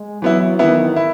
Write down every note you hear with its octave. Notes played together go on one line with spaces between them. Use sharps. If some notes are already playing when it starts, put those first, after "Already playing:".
Already playing: G#3
E3 F#3 B3 E4
D#3 E3 B3 E4
E4